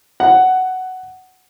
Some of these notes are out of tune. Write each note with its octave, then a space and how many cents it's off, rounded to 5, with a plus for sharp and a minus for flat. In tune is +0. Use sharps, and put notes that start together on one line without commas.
F#5 +10